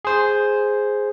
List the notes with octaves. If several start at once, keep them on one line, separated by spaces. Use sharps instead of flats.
G#4 C5